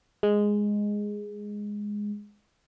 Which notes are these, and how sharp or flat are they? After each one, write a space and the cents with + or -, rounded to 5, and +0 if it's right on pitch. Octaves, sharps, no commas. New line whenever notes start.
G#3 -5